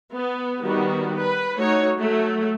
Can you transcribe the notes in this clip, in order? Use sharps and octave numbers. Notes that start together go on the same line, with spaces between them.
B3
D#3 G3 B3 F#4
B4
A3 D#4 F#4 C#5
F#3 A3